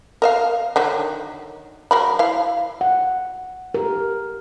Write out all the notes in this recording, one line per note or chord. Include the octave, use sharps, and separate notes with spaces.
A#4 D#5 F5
D3 D#3 F#3
F#3 A#4 B5
E4 F5
F#5
G4 A#4